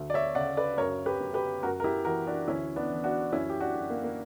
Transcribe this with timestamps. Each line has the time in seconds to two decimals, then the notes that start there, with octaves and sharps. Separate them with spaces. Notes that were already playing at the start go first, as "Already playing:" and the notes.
Already playing: D2
0.10 D5
0.14 C#5 E5
0.35 C#3 D5 F#5
0.57 B4 D5
0.77 F#2 A#4 C#5
1.06 G4 B4
1.20 F#2
1.34 G4 B4
1.63 F#2 F#4 A#4
1.80 A#4
1.84 E4 G4
2.05 E3 F#4 A#4
2.27 D4 F#4
2.48 D2 C#4 E4
2.76 B3 D4
2.90 E3
3.04 D4 F#4
3.32 F#2 C#4 E4
3.50 G4
3.61 D4 F#4
3.75 F#2
3.90 A#3
4.04 A#3